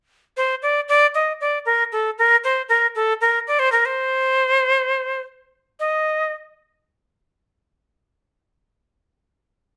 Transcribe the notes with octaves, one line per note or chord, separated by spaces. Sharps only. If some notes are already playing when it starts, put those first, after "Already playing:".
C5
D5
D5
D#5
D5
A#4
A4
A#4
C5
A#4
A4
A#4
D5
C5
A#4
C5
D#5